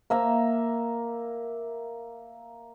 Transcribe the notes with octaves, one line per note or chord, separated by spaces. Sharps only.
A#3 E5 A#5